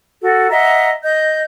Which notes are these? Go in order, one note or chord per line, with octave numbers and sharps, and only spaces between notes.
F#4 A4
D#5 E5 F#5 A#5
D#5 G6